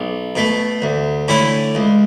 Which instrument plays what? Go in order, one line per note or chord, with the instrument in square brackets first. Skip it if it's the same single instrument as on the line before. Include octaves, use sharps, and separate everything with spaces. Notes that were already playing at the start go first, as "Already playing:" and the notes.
Already playing: [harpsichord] B1
B2 A3
D2
D3 A3 C#4 E4
C#2